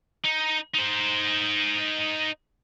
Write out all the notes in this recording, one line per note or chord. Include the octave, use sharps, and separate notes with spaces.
D#4
D#4 C5